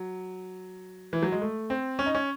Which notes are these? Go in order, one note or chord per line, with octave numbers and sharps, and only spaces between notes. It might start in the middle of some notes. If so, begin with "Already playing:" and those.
Already playing: F#3
E3
F#3
G#3
A3
C4
C#4
D#4
C#4